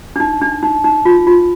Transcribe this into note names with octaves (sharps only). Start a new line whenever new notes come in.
D4
D#4
D4
D#4
D#4
F4
F4